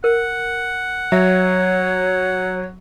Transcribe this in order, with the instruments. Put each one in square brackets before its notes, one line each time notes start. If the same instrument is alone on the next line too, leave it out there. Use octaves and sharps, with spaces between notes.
[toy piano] A#4 [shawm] F#5
[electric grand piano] F#3 [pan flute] C#5 [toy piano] E5